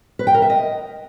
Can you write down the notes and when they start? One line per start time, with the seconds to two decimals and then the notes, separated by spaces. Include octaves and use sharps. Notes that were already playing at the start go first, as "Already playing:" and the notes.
0.19 B4
0.27 G5
0.34 A#4
0.42 E5
0.50 D#5